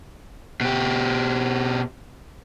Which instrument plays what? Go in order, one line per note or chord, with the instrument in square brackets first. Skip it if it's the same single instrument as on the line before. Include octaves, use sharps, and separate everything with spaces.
[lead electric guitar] B2 G4